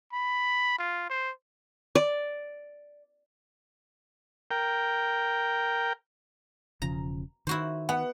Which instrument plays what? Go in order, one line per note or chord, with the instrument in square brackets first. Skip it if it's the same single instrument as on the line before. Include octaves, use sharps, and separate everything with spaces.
[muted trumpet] B5
F4
C5
[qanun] D5
[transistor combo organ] A#4 G5
[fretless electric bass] E1 C#3 F3 [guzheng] A#5
[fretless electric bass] D#3 [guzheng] E4 F#4 C5
[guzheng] B3 [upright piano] F#5